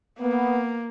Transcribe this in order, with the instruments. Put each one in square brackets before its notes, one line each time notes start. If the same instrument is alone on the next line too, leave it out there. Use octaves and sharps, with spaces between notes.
[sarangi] A#3 [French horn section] B3